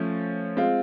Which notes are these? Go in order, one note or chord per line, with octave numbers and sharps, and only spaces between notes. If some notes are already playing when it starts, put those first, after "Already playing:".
Already playing: F3 A3 C#4
G#3 C4 F4